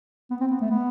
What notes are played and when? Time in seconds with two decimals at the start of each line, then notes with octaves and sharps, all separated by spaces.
0.30 B3
0.41 C4
0.51 B3
0.61 A3
0.70 B3